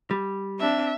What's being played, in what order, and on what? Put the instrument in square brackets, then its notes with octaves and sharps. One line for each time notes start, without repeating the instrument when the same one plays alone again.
[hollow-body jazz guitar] G3
[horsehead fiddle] C4 D4 [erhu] E5